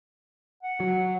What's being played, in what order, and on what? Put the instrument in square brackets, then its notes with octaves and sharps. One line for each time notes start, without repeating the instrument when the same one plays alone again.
[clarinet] F#5
[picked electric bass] F#3